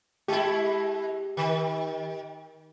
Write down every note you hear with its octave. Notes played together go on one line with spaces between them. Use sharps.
G#3 E4 G4
D#3